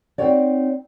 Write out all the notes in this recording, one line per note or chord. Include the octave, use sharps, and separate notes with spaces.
C4 D4 D#4 F#4 C#5 D5